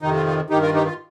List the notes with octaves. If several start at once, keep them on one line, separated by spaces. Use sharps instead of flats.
F2 C3 D#3 D#4
F4
F4
G2 D#3 D#4 G4
F4 A#4
D#4 G4
F4